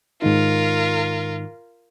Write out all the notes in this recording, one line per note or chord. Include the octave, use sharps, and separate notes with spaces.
G#2 D#3 D#4 F4 A#4